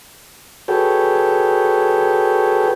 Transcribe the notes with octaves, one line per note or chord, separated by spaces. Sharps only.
F#4 G#4 A4 B4 C#5 G5